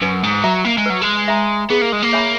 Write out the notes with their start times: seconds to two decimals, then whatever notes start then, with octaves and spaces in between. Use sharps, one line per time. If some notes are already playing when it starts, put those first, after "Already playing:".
0.02 F#2 B4
0.23 G#2
0.44 F#3 E5 A#5
0.65 A#3
0.78 G#3
0.86 F#3 B4
1.02 G#3
1.28 E5 A#5
1.70 B3 G#4
1.81 A#3
1.92 G#3
2.02 A#3
2.13 C#5 E5 G#5 B5